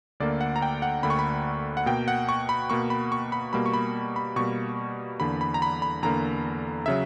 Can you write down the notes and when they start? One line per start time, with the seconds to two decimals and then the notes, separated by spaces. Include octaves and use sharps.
0.20 D2 D3 A#3 D5
0.41 F#5
0.56 A#5
0.62 G5
0.82 F#5
1.03 D2 D3 A#3 B5
1.10 C#6
1.19 B5
1.77 F#5
1.86 B2 A#3 G5
2.08 F#5
2.29 C#6
2.49 B5
2.70 B2 A#3 C#6
2.90 B5
3.12 C#6
3.32 B5
3.53 B2 G3 A#3 B5
3.66 C#6
3.74 B5
4.16 B5
4.36 B2 G3 A#3 C#6
5.20 E2 D3 A#3 B5
5.41 B5
5.54 A#5
5.62 B5
5.82 B5
6.02 E2 D3 A#3 A#5
6.86 C#3 F#3 E5